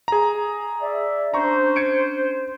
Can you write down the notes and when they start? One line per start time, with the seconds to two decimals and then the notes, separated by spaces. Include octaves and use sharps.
0.08 G#4 A#5
0.82 D5 E5
1.34 C#4 D4 C5 A#5 C#6
1.76 G#6 C#7 D7